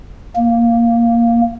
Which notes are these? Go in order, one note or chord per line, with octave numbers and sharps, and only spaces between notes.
A#3